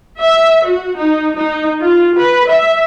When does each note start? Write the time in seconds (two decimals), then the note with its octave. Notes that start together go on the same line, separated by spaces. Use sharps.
0.20 E5
0.65 F#4
0.96 D#4
1.36 D#4
1.81 F4
2.15 B4
2.48 E5